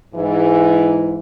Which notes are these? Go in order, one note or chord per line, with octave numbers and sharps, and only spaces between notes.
G#2 E3